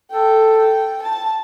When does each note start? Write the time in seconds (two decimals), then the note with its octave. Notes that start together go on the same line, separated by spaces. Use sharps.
0.11 A4 G5
0.57 G5
1.02 A5